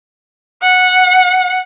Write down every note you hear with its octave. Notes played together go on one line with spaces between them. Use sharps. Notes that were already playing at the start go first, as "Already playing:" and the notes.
F#5